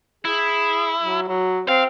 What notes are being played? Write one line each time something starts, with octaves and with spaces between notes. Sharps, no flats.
E4 G#4
F#3
F#3
C4 F5